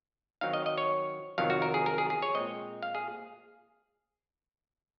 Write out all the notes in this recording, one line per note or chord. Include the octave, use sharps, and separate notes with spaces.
D#3 F#3 C4 D#4 F5
D#5
D#5
C#5
F2 C3 D#3 F#3 F5
F#4
A#4
G#4
A#4
G#4
G#4
C#5
A#2 G#3 C4 D#5
F5
G#4